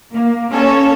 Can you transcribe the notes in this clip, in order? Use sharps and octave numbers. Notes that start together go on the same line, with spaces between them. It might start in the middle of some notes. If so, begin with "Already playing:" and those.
A#3
A#3 C#4 A4 C#5